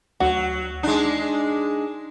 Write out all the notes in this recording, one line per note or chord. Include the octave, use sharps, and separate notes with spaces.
D2 F#3 F#4
G#3 D4 D#4